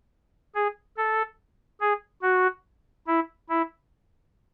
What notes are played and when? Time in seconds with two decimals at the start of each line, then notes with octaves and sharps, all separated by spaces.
0.55 G#4
0.97 A4
1.80 G#4
2.22 F#4
3.07 E4
3.49 E4